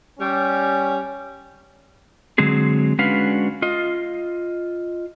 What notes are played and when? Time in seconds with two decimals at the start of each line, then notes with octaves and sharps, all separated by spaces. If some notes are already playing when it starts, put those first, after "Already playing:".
0.19 G3 C#4
2.38 D3 F#3 G#3 C4 G#4
2.99 G#3 C#4 D4 F#4 B4 F5
3.62 F4 D#5